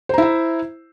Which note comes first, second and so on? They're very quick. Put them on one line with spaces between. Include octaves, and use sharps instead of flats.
C5 A#5 E4 E5